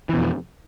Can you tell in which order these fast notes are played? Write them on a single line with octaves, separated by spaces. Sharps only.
E3 B2 F2